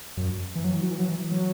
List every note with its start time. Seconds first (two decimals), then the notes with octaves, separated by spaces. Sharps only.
0.17 F#2
0.56 E3
0.64 F#3
0.73 E3
0.82 F#3
0.91 E3
0.99 F#3
1.09 E3
1.31 F#3